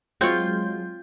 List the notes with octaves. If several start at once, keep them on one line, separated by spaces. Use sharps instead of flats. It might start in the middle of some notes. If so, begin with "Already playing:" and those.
F#3 G#3 C4 F4 C#5 G5 G6